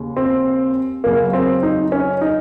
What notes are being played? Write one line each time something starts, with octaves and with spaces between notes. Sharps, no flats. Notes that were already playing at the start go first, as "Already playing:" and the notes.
Already playing: D#2 C#3
C4
F#2 C#3 F#3 A#3
C4
D#4
C#4
D#4